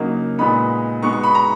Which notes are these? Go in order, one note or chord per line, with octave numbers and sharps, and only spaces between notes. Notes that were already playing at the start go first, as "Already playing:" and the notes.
Already playing: C#3 F#3 A#3 D#4
A#2 G#3 B3 D#4 B5
B2 G#3 B3 D#4 C#6
C#6
B5
A#5